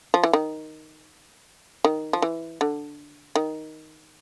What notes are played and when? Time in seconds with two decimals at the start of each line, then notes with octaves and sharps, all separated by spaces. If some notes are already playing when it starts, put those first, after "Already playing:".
0.14 F3
0.23 E3
0.33 D#3
1.84 D#3
2.13 F3
2.22 E3
2.61 D3
3.35 D#3